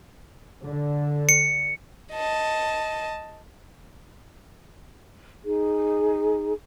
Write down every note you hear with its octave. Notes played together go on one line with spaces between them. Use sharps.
D3
C#7
D#5 A5
D#4 G#4